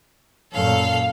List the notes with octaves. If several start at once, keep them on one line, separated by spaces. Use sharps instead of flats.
F#2 A#2 A4 F5